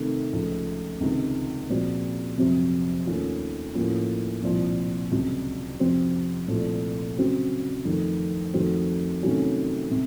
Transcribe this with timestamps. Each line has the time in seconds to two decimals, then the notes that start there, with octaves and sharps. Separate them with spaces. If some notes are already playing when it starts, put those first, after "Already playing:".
Already playing: C3 D#3 A3 D#4
0.33 C#2 C#3 F3 A3
1.00 C#2 C3 D#3
1.69 A#2 F3 C4 F#4
2.38 F2 C3 F#3 C4
3.06 D#2 D#3 A3 C#4 F4
3.74 A2 F3 A#3 C#4 F4
4.43 C2 A#2 F3
5.11 C#2 C3 F#3
5.80 F2 C3 F3 C4 F#4
6.48 C2 A#2 F3 A3
7.17 C#3 F#3 C4 F#4
7.85 F2 D#3 A3
8.54 F2 D#3 A3 C4 F#4
9.23 C3 D#3 F#3 A3 C#4
9.91 C3